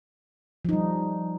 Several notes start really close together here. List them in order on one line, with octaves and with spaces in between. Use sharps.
F3 D#4 G3